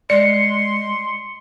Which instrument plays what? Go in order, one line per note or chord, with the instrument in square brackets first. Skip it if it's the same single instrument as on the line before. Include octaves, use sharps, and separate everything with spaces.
[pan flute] G#3 [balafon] D5 [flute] C6 [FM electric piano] C#7